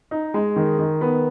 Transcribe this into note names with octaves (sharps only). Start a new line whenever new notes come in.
D#4
G#3
D#3
D#3
B3